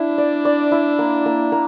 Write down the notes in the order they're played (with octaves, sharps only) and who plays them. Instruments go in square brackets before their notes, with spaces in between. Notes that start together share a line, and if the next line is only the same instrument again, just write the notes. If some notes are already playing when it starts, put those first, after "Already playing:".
Already playing: [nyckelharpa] D4 [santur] E4
[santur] D5
D5
E4
A#3
A#3
A#3